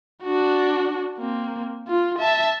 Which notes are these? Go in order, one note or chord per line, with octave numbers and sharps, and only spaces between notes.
D4 F#4
A#3 C4
F4
E5 A5